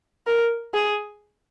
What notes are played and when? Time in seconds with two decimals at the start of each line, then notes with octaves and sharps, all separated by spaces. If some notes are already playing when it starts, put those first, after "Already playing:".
0.27 A#4
0.74 G#4